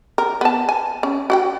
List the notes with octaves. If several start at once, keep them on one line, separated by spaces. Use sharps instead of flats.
A#4
B3 A5
G#5
C#4
F#4 F#5 G5